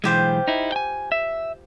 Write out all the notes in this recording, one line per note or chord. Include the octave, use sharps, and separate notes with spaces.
B1 E3 G#3 F4 G4 C5
D#4 E4
G5 G#5
E5